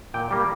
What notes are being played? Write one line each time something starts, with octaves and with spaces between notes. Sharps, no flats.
A#2 G5
G3 A#3